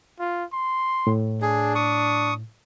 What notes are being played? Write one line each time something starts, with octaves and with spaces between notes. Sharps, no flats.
F4
C6
A2
D4 G#4
C#6 D#6